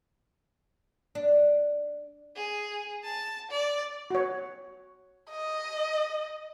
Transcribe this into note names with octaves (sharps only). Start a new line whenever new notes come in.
D4
G#4
A5
D5
F#4 C#5
D#5